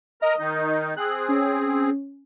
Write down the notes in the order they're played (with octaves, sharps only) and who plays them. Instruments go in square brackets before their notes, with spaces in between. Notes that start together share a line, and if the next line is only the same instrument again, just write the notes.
[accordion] A#4 A#5 [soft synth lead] D#5
[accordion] D#3 D#4
[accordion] C4 G#4 [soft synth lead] F#6
[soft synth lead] C#4